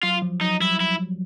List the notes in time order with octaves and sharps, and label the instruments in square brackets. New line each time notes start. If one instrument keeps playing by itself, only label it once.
[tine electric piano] F#3 [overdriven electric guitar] F4
[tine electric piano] F3
[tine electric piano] F#3 [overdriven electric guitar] D#4
[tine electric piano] G3 [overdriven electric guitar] E4
[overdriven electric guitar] E4